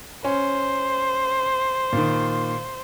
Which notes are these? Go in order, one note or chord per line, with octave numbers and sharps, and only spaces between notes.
C#4 C5
A#2 D#3